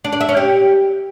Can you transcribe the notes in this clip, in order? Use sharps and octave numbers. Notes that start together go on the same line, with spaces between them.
D4
D5
E5
C#4
G4